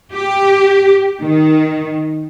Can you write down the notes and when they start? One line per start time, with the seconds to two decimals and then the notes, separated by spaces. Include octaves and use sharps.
0.15 G4
1.21 D#3